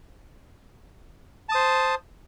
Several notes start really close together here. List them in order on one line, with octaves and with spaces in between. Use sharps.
A5 D#6 C5